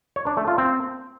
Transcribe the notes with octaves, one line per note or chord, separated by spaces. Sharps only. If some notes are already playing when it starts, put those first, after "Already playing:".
C#5
D4
A3
F4
C4